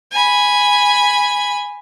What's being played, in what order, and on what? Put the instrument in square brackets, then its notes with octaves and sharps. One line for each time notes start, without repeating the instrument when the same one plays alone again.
[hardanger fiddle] G#5 B5